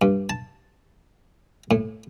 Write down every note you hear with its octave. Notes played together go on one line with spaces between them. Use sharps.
G2
A5
A2